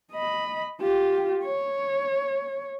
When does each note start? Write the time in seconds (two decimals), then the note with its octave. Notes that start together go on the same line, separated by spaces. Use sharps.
0.13 D#5 B5
0.81 F4 G4
1.44 C#5